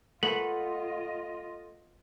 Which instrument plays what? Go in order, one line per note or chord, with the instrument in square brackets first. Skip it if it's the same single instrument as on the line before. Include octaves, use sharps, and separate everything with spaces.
[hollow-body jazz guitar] A3 [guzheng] B3 [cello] F4 D#5 [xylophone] F#7